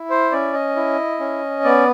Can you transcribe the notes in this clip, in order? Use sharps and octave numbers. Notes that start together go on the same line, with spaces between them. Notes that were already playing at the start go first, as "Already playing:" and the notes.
Already playing: E4
C5
C#4 D5
D#5
E4
C#4
B3 D5